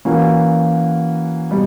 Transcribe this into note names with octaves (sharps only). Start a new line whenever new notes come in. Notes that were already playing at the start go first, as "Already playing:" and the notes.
E3 A#3 C#4 F#4
B2 G3